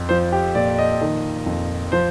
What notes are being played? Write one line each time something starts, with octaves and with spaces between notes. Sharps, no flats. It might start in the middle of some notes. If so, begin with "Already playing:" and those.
Already playing: F2
F3 C5
G4
A#2 D5
D#5
D#3
F2
F3 C5